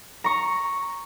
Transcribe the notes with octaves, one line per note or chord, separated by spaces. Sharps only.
A#5 C#6